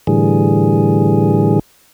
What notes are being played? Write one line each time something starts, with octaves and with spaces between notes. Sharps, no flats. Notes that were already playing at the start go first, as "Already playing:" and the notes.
A2 D3 E3 G3 G#4